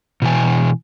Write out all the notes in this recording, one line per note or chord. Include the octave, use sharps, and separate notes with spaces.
B2 E3 G#5